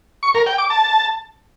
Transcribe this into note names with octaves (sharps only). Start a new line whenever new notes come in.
C#6
A#4
G5
D6
A5